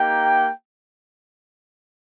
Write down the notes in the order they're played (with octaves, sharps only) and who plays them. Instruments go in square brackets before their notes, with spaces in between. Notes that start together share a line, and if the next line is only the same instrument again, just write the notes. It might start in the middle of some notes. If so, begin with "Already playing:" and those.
Already playing: [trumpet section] A#3 D#4 G4 G5